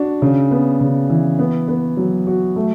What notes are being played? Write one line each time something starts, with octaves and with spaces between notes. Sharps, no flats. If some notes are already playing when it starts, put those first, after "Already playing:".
Already playing: D4 F#4
C#3
B3
C#3
E3
B3
B3
F#3
F#4
A3